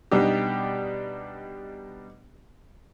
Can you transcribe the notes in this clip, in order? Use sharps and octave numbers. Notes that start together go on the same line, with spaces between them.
B2 G3 D4 D#4 G4